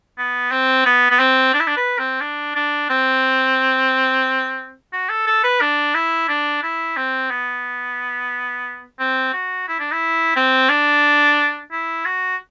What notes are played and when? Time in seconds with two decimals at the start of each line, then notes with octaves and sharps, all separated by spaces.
0.18 B3
0.52 C4
0.86 B3
1.11 B3
1.19 C4
1.54 D4
1.60 E4
1.67 D4
1.77 B4
1.99 C4
2.21 D4
2.55 D4
2.90 C4
4.93 F#4
5.09 A4
5.27 A4
5.44 B4
5.61 D4
5.94 E4
6.28 D4
6.63 E4
6.97 C4
7.31 B3
9.00 C4
9.33 F#4
9.68 E4
9.79 D4
9.92 E4
10.36 C4
10.69 D4
11.72 E4
12.06 F#4